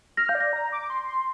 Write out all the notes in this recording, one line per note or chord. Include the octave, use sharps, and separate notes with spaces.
F6 A#6
F5 G6
D5
A#6
A#5
D6
C6
C6